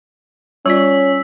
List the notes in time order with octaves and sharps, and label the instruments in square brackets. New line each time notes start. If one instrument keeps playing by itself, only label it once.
[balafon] G3 F4 D5 [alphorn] C#4 [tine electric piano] C#5 [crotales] E6 B6